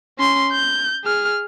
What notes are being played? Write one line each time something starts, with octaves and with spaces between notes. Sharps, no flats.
C#4 C6
G6
G#4 F6